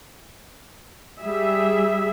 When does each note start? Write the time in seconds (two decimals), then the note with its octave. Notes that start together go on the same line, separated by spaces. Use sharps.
1.20 G3 G#4 E5